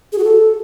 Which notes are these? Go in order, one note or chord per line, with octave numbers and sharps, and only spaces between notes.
G#4
F#4
A4